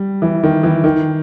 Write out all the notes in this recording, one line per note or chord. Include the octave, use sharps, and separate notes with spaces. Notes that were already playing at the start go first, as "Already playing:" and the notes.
Already playing: G3
E3
D#3
E3
D#3